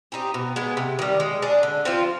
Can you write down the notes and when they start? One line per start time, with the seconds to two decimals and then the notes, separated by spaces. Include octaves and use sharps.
0.12 C4 D#4 G4
0.34 B2
0.56 G#3 B3
0.77 C3
0.99 D#3 G3
1.20 G#3
1.42 D4 G#4
1.63 D3
1.85 F3 C4 F4